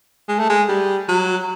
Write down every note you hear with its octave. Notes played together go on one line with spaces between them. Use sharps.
G#3
A3
G#3
G3
F#3